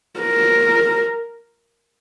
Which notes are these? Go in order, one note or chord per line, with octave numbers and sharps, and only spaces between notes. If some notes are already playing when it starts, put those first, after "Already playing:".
A#4